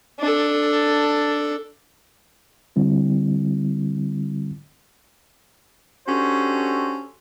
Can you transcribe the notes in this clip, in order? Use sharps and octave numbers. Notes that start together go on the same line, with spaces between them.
D4 A4
D3 G3 C4 E4
C#4 D4 F#4 G4 A4 C5